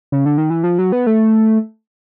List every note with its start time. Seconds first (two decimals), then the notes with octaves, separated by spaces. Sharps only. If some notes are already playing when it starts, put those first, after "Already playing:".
0.12 C#3
0.26 D3
0.38 D#3
0.50 E3
0.64 F3
0.79 F#3
0.92 B3
1.07 A3